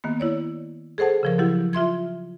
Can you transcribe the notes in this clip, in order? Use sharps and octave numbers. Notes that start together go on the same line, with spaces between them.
D#3 A#3 B3
E4 C#5 D5
G#4 A4 C5 F#5 A5
C#3 F3 A#4
F3 F#3 E4 G4
F4 E5 C6 G#6